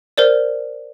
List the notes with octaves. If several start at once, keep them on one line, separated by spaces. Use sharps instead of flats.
A#4 C5 D5